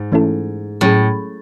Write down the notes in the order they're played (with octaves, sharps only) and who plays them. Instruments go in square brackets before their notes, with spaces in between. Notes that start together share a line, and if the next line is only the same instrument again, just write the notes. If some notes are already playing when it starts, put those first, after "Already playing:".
Already playing: [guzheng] G#2
[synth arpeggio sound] E3 A3 C#4 E4 A4
[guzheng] A2 [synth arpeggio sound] F#3 C#4 G#4